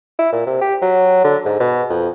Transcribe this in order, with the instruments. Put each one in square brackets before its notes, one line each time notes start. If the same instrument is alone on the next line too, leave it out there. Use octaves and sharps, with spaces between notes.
[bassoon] E4
A#2
C3
G4
F#3
D3
G#2
B2
F2